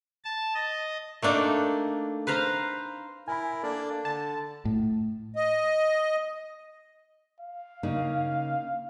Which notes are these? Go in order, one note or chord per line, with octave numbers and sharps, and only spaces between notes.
A5
D#5
A3 A#3 D4 D#4
B4 C5 F5 A#5
E4 A#4 G#5 B5
A#3 D4 A4 D5
D3 A5
A2
D#5
F5
C#3 A#3 D#4